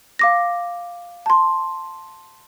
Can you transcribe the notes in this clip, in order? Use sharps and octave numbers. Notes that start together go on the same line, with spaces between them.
F5 D6 A#6
A5 C6